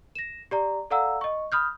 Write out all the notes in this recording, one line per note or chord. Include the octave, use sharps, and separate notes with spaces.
A#6 E7
G4 D5 A#5
A4 D5 F5 F#5 A#5 E6
D#5 C#6
B5 D#6 F6 G6